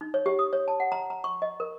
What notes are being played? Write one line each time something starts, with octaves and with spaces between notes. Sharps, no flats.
D#4
C#5
G4
D#6
C#5
A5
F#5
A#5
A#5
C#6
D#5
A#4